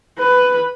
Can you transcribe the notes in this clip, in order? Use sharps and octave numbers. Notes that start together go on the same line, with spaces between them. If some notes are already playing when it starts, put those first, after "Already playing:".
B4